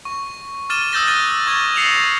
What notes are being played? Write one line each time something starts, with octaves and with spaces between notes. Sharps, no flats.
C#6
D6 F6 A6 D#7 E7 G7
D#6 E6 G6 A6 A#6 G7
D#6 F6 F#6 A6 D#7 G7
C#6 G#6 A6
A#6 C7 C#7 D#7 F7 F#7